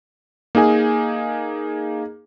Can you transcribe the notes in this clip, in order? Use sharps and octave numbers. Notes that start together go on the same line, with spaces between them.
A#3 D#4 G#4 G#5